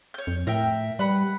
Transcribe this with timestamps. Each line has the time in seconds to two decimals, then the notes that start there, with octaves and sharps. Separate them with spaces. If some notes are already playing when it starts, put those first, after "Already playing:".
0.14 C#5 G6
0.27 F2
0.47 A2 A#4 E5 G5
0.99 G3 B4 F#5 B5